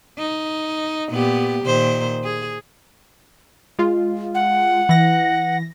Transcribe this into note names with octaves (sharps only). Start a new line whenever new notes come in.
D#4
A#2 B3 G4
A#2 D#3 C5
G#4
G#3 F4
F#5
E3 A#6